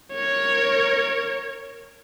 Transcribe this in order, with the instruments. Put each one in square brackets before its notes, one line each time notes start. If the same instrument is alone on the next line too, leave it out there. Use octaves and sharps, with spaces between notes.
[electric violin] A#4 C#5